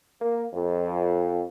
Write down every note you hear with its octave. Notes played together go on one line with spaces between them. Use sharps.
A#3
F2